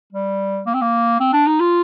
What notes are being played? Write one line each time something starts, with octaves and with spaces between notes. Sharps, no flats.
G3
A#3
C4
A#3
C4
D4
D#4
F4